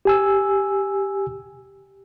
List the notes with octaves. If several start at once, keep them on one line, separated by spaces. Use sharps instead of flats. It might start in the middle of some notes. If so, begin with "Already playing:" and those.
G4 G#5 E6